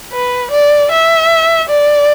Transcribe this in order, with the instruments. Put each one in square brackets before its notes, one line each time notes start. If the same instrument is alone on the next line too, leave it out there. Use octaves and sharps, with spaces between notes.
[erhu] B4
D5
E5
D5